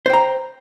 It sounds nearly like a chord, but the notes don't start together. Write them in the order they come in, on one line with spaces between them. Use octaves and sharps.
C5 G5 A#5